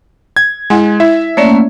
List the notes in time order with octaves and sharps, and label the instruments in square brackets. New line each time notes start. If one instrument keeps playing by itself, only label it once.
[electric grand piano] G#6
[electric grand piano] G#3 [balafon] E4 F#5 G#5
[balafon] E4 [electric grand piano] E5
[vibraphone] A3 A#3 C#4 [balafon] C#5 D5